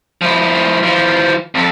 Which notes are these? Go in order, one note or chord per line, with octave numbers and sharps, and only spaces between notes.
F3 E4
E3 F3
F2 A4